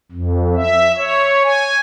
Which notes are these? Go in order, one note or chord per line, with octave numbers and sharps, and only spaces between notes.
F2
E5
C#5
G#5